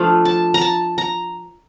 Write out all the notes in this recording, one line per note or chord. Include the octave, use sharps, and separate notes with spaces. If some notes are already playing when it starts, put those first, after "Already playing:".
Already playing: F3 A3 D4 F4
A5
A#5
A5
A#5